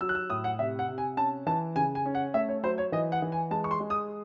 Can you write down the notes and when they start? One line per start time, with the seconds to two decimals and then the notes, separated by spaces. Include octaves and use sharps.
0.01 F#3 E6
0.09 F#6
0.15 E6
0.30 A2 D#6
0.44 F#5
0.59 C3 E5
0.79 F#5
0.88 C3
0.98 G#5
1.17 C#4 A5
1.46 E3 A5
1.75 C#3 G#5
1.95 G#5
2.06 C#4
2.15 F#5
2.34 A3 E5
2.49 C#5
2.63 F#3 C5
2.78 C#5
2.92 E3 D#5
3.12 F#5
3.22 E3
3.32 G#5
3.51 G#3 A5
3.64 C#6
3.71 C6
3.80 G#3
3.90 D#6